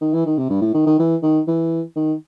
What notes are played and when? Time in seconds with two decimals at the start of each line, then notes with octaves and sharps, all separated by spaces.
0.01 D#3
0.13 E3
0.26 D#3
0.38 C3
0.49 G2
0.62 A2
0.74 D#3
0.86 D#3
0.99 E3
1.23 D#3
1.47 E3
1.96 D#3